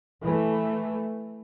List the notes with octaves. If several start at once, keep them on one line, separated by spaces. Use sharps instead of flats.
E3 A3